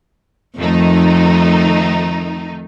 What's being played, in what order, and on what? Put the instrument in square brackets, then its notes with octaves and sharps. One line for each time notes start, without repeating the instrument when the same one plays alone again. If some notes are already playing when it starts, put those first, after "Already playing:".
[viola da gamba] F2 [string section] D#3 A3 D#4